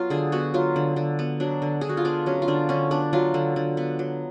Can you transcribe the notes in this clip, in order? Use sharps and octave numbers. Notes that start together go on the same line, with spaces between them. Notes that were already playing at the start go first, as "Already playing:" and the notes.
Already playing: F#3 B3 F4
D3 G#4
B3 F#4
F#3 F4
D3
D3
B3
F#3 D4
D3
D3 G#4
F#4
F4
B3 D4
F#3 C#4
F4
D3 D4
D3 C#4
B3 D4
F#3 F4
D3
D3
B3
F#3